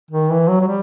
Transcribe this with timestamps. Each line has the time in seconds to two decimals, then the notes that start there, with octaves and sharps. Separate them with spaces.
0.11 D#3
0.31 E3
0.48 F#3
0.61 F#3
0.67 G3